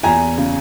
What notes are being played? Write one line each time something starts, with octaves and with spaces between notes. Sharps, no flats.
E2 G#5 A#5
C#3